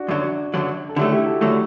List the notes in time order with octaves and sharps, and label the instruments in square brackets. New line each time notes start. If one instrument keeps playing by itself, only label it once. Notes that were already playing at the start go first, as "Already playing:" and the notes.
Already playing: [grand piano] D4 F#4
[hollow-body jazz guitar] F#2 D3 F#3
F#2 D3 F#3
[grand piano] A4
[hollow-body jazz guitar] D3 F#3 A3 [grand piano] E4 G4
[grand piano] E4 G4
F#4 A4
[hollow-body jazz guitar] D3 F#3 A3